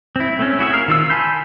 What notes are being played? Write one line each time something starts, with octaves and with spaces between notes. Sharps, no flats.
C4 E4
A3 C4 C#4
E4 F#4 G#4 E5
A#4 F5
D#3 F4 E6
G#5 A5 B5 C6 G6